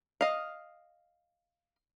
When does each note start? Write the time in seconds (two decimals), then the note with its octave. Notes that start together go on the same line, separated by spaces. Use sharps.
0.21 D#5 F5